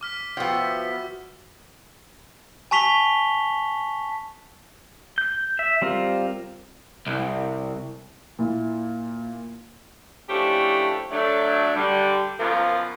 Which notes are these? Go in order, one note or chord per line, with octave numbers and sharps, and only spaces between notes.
D6 F6 B6
F3 B3 F#4 E5 G5
G#5 A5 C#6 B6 F7 G7
G6
E5
G3 C4 F4 A#4
C2
A#2 E4
F3 A3 C#4 D4 E4 G4
F#3 A3 D4
D3 G3
F#2 B2 F3 A#3 F4 A#4